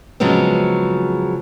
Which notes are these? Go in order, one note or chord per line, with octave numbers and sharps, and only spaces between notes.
C#3 F3 F#3 G#3 B3 C4